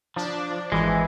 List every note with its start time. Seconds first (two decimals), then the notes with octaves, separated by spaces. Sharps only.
0.16 F3 D4
0.72 G#1 E3 G#3